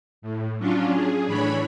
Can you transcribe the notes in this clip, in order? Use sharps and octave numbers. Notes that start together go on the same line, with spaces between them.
A2
F#3 C#4 D4 F4
G#4
A2 E3 D4 C#5 B5